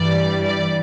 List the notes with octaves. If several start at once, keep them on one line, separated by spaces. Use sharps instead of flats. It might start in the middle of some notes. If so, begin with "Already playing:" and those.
Already playing: G2 E3 G3 D5
D5